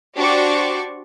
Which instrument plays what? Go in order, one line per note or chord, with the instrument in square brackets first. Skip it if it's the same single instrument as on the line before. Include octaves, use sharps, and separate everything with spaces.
[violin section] D4 F#4 G4 C5 D5 C#6